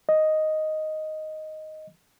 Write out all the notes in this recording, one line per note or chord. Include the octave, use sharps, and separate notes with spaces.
D#5